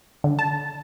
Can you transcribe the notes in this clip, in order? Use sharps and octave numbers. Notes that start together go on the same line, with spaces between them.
D3
A5